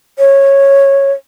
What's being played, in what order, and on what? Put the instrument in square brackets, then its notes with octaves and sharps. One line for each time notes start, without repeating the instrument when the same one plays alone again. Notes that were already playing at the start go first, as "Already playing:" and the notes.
[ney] C#5